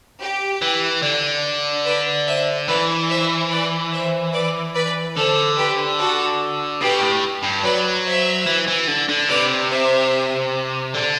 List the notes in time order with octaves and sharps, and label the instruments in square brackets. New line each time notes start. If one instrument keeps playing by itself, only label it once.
[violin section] G4
[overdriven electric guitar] E3
D3
[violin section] B4 D5
C5 E5
[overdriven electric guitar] E3 [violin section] B4 D5
[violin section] C5 E5
B4 D5
C5 E5
B4 D5
B4 D5
[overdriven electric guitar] D3 [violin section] A4 C5
[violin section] G4 B4
F#4 A4
[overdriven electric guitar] B2 [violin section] G4 B4
[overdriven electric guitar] A2
G2
[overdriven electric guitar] F#3 [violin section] B4 D5
[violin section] C5 E5
[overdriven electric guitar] E3
E3
D3
D3
[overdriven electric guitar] C3 [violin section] B4 D5
[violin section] C5 E5
[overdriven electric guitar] D3